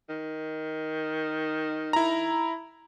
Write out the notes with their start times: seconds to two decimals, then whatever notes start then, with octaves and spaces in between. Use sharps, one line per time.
0.09 D#3
1.93 E4 A#5